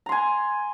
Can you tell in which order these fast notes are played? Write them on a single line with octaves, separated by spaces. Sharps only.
A#5 C6 G#5